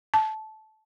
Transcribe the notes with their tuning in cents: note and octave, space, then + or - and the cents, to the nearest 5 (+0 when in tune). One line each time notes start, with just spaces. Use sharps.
A5 -15